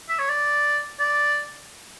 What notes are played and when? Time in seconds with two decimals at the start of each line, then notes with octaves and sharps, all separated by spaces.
0.09 E5
0.19 C#5
0.29 D5
0.99 D5